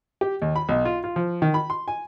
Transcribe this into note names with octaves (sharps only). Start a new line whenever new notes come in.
G4
D#2
B5
B1
F4
F4
F3
D#3
B5
C6
G#5